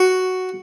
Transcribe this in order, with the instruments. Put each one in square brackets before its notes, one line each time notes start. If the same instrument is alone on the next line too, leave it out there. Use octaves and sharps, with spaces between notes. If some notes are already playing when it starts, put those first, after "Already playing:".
Already playing: [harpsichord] F#4